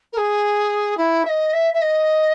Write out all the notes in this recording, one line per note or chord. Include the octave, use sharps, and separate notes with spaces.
A#4
G#4
E4
E5
D#5
E5
E5
D#5